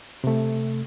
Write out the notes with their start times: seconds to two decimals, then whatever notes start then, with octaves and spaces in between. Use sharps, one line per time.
0.24 C3 A3